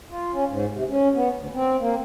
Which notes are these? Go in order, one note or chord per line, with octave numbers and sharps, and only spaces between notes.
F4
C#4
G#2
C3
C#4
B3
D2
C4
A#3